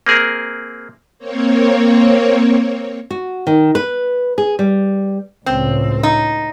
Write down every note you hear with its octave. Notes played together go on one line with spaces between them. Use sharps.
A#3 C4 G#4 A#4
A#3 C4 C#5
F#4
D#3
B4
G#4
G3
C#2 A2 C4
D#4